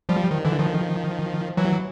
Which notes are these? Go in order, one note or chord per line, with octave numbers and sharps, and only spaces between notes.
F3 G3
D#3
D3 E3
D#3 F3
E3 F#3